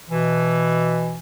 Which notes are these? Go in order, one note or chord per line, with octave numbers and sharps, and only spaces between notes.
B2 E3